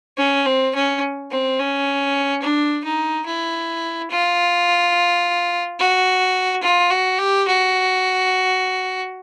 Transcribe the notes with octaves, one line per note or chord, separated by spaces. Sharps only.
C#4
C4
C#4
C4
C#4
D4
D#4
E4
F4
F#4
F4
F#4
G4
F#4